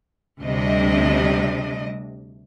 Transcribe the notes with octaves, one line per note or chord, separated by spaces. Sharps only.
D2 C3 G3 D4 D#5